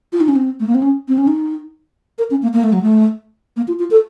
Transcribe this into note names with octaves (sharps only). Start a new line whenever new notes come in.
F4
D#4
C#4
C4
A3
A#3
C4
C#4
C4
C#4
D#4
A#4
C#4
A#3
A#3
A3
F#3
A3
A#3
F4
F4
A4